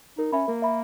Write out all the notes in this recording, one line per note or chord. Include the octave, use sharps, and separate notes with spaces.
D#4 A#4
C#4 E5 B5
A#3 A#4
E5 B5